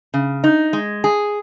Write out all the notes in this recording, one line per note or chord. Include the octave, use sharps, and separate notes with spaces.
C#3
D#4
G#3
G#4